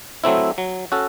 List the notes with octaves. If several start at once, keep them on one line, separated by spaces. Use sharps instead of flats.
F#3 A3 C4 E4
F#3
C#4 F#4 A4